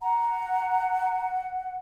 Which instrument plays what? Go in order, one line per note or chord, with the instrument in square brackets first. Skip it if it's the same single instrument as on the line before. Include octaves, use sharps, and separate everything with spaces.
[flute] F#5 [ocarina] A#5